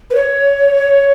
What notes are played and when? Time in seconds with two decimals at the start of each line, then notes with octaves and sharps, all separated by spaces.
0.10 B4
0.15 C#5